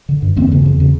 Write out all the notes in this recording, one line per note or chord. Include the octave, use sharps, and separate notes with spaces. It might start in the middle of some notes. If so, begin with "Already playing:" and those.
D3
G2
E2 A#3 C4
C#3
E2
C#3